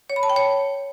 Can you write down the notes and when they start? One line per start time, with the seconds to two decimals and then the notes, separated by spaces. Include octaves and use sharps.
0.10 C#5
0.16 B5
0.23 A5
0.30 G5
0.36 C#5